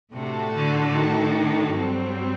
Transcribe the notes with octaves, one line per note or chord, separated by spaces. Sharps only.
A2 C3 A3 D4 F#4 A4
D3
D#3
G2 F#3 G3 C4